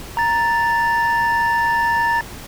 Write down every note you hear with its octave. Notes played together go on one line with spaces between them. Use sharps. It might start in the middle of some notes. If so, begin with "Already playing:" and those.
A#5 A6